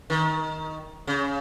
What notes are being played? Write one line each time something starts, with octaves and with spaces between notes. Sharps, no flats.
D#3
C#3